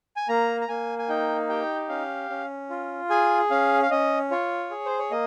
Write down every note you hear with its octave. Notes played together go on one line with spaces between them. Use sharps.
G#5
A#3 A#5
A#5
A#3 G#5
G#5
D#4 G5
G4 G5
C#4 F5
C#4
F4
G#4 G#5
C#4 F5
F5
C#4 D#5
F4 C#5
G#4
C5
C#5
A#3 D#5